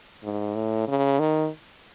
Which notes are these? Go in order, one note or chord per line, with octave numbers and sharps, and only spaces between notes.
G#2
A2
C#3
D#3